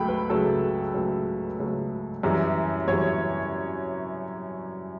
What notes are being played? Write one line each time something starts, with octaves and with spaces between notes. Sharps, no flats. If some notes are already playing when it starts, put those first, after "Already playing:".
Already playing: C#2 F#3 A3 G5 B5
B4
C#2 C#3 F#3 A3 A4
C#2 C#3 F#3 A3
C#2 C#3 F#3 A3
F#2 E3 G3
F#2 E3 G3 C#5